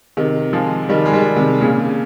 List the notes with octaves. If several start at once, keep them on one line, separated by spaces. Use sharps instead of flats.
C3 D#3
F3 G#3
D#3 G3
G#3
D#3 G3
C3 D#3
A#2 C#3